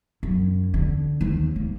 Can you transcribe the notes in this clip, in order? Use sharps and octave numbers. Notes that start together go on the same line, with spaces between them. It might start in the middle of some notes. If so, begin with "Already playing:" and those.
F#2
D3
D#2
A#3